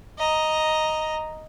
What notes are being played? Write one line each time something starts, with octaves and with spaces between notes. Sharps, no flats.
D#5 A#5